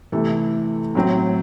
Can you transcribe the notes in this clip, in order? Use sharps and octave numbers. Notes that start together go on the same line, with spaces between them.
C3 E3 A3 E4 A4
A2 F#3 C4